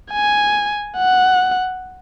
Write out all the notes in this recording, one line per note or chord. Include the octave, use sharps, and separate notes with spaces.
G#5
F#5